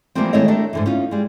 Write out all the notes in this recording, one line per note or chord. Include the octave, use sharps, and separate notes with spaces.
E3 F3 G3 A3 A#3 C4
D#3 G#3 A3 E4 C#5 D#5
A3 D4 G4 A4 A#4
G#2 D3 E3
C#4 D#4 F4
G3 G#3